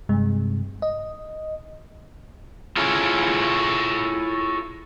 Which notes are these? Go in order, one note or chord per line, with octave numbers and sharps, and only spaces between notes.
G2 C3 G#3
D#5
E4 F4 G#4 A4 C#5